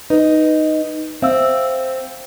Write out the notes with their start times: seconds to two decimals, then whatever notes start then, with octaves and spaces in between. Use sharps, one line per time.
0.10 D#4 B4
1.22 C4 E5 F5 E6